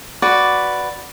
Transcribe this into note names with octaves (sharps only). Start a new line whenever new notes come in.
F#4 B4 D5